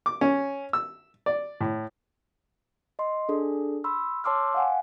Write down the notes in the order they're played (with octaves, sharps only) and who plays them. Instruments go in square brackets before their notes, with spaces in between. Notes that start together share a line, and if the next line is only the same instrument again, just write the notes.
[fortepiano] D6
C#4
E6
D5
A2
[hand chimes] D#5 C6
D4 G#4 A4
B5 C6 E6
C#5 A5 C6 D6 E6 F6
F5 F#5 G#5